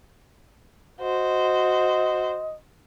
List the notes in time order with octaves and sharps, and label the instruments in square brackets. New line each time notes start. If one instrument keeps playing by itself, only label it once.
[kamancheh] F#4 C5 [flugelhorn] D#5